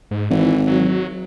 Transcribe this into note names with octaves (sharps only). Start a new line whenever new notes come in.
G#2
G#1 E3
F#3